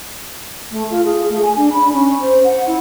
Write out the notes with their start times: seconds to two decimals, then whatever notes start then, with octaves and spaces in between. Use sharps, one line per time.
0.71 A3
0.90 F4
1.05 G#4
1.29 A3
1.42 G#5
1.56 D4
1.72 B5
1.93 C#4
2.20 C5
2.44 F#5
2.67 E4